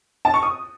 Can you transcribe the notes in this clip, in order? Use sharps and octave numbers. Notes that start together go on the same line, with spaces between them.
A5
C#6
D#6